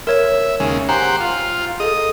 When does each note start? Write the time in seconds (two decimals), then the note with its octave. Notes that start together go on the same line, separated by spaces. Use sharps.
0.07 A#4 C#5 E5 E7
0.60 D#2 C#3 G#3
0.89 G4 C5 F#5 G#5 A#5
1.20 F4
1.80 G#4 A4 D#5